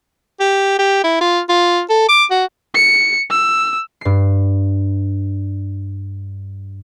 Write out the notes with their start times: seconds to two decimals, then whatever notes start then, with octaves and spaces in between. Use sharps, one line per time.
0.40 G4
0.79 G4
1.04 E4
1.21 F4
1.49 F4
1.90 A4
2.09 D6
2.31 F#4
2.75 C#7
3.30 E6
4.01 G2 C7